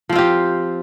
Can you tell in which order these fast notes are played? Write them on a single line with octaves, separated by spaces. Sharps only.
F3 C4 F4 G4